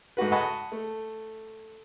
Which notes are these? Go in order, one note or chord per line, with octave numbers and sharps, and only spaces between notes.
G#2 A3 F#4 B4
D#5 F#5 G#5 A5 B5 C#6
A3